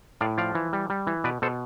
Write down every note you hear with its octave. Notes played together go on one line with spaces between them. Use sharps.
A2 D5 F5
F3 D5 F5
E3
G3
G3
E3
B2 B4 D5
B2 A4 C5